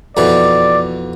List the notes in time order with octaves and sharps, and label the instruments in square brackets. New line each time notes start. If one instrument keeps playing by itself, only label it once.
[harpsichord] F2 B2 E3 [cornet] D5